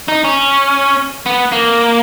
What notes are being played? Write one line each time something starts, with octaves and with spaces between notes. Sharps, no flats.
D#4
C#4
B3
A#3